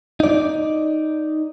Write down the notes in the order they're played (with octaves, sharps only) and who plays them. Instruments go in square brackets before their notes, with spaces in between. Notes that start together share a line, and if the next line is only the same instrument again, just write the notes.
[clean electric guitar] D#4 D5